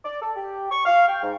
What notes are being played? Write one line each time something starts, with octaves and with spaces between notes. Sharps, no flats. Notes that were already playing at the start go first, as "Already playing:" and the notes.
D5
A4
G4
C#6
F5
G5
G#2